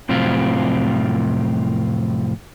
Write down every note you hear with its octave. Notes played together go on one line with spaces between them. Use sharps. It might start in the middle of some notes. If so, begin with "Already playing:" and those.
F2 A2 C3 F#3 C4 F4